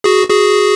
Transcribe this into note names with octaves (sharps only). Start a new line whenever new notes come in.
F#4 G#4
F#4 G#4